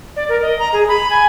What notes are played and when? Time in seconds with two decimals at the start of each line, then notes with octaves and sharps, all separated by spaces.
0.16 D5
0.29 A#4
0.42 D#5
0.59 A#5
0.73 G#4
0.88 B5
1.10 G#5